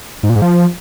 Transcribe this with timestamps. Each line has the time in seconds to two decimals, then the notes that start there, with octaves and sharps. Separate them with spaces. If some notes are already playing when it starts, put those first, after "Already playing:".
0.23 G#2
0.30 A#2
0.36 G#2
0.42 F3